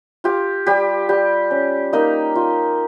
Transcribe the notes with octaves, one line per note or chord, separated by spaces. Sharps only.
F4 G4
G3 G4
G3 G4
C#4
A#3 D#4 D#5
F4